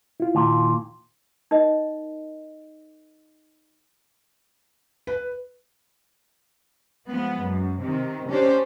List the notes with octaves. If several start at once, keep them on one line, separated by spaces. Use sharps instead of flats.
E4 F4
D#2 A#2
D#4 A#4 D#5
B4
F3 G#3 B3
F#2
C3 D#3
C#4 D4 G4 C5